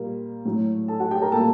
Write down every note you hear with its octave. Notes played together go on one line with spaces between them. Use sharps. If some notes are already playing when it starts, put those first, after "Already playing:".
Already playing: A#2 G3 A#3
A2 F#3 A3
A4 A5
F#4 F#5
G4 G5
A#4 A#5
A#2 G3 A#3 A4 A5